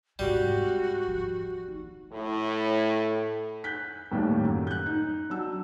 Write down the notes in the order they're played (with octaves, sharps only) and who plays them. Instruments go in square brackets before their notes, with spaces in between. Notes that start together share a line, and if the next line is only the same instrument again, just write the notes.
[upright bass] G#2 C3 [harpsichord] G3 [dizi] F#4
[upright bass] F3
D#4
[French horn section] A2
[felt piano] F#6 G6 B6
D#2 A2 D#3 G3 A#3
F#2
F#6 G6
D#4
F#3 D4 E6